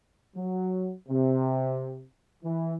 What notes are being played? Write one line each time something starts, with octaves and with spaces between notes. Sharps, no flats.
F#3
C3
E3